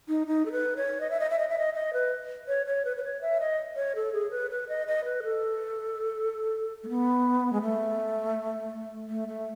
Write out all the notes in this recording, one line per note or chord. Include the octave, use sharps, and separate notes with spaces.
D#4
D#4
A4
B4
C#5
D#5
E5
D#5
E5
D#5
E5
D#5
D#5
B4
C#5
C#5
B4
B4
C#5
E5
D#5
C#5
A4
G#4
B4
B4
D#5
D#5
B4
A4
A3
B3
G#3
A3
A3
A3